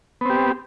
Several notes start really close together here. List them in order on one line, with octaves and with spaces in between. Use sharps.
B3 C4 G4